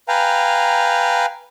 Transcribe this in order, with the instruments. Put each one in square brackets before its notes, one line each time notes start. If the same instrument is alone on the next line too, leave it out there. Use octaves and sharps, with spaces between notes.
[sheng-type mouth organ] B4 F5 G5 G#5 A#5